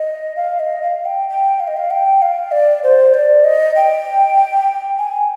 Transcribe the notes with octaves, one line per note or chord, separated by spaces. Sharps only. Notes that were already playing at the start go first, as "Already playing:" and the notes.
Already playing: D#5
F5
D#5
F5
G5
G5
F5
D#5
F5
G5
F5
D5
C5
D5
D#5
G5
G#5